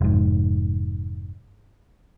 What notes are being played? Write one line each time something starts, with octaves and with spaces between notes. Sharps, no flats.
F1 G#2